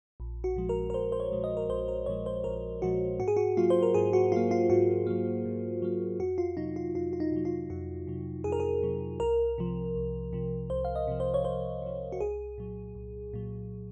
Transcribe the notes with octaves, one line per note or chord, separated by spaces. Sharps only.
A#1
F#4
A#2 F3 G#3
A#4
A#4
A#1 C5
C5
C#5
A#2 F3 G#3
D#5
A#4
A#1 C5
A#4
A#2 F3 G#3 C#5
C5
A#1 A#4
A#2 F3 G#3 F#4
G#2 F#4
G#4
F#4
F#3 A#3 F4
C5
A#4
G#2 G#4
F#4
F#3 A#3 F4
F4
G#2 F#4
F#3 A#3
G#2
F#3 A#3
F2 F#4
F4
C3 F#3 D#4
F4
F2 F4
F4
D#4
C3 F#3
F4
F2 F#4
C3 F#3
F2 G#4
A#4
G#4
C3 F#3
C2 A#4
C3 F3
C2
C3 F3
C2 C5
F5
D#5
C3 F3
C5
C#5
C2 C5
C3 F3
F#4
C2 G#4
A#2 F#3
C2
A#2 F#3